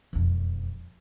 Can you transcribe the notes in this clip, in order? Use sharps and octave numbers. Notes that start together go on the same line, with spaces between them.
E1 F2